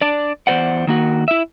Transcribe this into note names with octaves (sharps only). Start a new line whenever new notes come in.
D4 D5
E2 G3 C5 D5 F#5
D#3 A#3 F#4
E4 E5